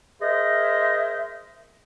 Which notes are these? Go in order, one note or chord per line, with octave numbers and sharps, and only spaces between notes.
G#4 A#4 C5 D#5 E5